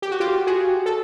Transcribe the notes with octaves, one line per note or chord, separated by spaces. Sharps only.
G4
F#4
F4 G4
F#4 G#4
A4